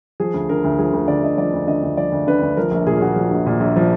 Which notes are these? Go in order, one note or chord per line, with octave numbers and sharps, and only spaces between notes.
F3 G#4
D2
D3 A#4
D2
F3 G#4
D2 A#4
D3 D5
D2 D#5
F3 D5
D2
D3 D#5
D2
F3 D5
D2
D3 B4
D2
F3 A#4
A#1
A#2 G#4
A#1 F#4
F3
A#1
A#2
A#1
F3